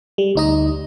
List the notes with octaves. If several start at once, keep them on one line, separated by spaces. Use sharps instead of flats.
G3
D2 D#4 D#5